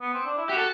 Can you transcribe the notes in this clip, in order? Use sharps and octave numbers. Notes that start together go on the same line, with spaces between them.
B3
C4
D4
E4
F#4 G4
A4